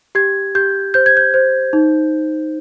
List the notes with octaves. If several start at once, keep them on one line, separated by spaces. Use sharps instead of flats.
G4 G#6
G4 G6
C5 G6
G#6
G6
C5
D#4